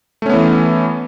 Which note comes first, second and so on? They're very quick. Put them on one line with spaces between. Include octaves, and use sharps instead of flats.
A3 C#4 B3 E3